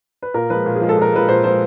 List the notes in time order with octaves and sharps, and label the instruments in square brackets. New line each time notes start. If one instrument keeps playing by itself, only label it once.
[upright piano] B4
A#2 A#4
F3 G#3 B4
A#2
G#4
F3 G#3
A4
A#2 A#4
F3 G#3 B4
A#2 C5
F3 G#3 C5